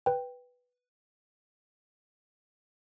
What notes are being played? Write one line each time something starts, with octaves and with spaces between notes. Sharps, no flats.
B4 G5